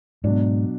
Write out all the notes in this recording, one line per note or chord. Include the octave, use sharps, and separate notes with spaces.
G#2 B2 F#3 D4